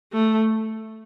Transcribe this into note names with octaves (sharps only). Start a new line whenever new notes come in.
A3